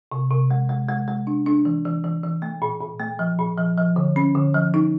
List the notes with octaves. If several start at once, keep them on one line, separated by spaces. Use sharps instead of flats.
C3
C3
G#3
G#3
G#3
G#3
D4
D4
E3
E3
E3
E3
A3
A#2
A#2
A3
F3
A#2
F3
F3
D3
C#4
D3
F3
D#4